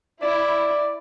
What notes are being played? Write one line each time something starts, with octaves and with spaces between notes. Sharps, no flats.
E4 D5